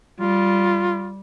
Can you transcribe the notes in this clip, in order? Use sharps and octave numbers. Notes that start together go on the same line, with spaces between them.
G3 F4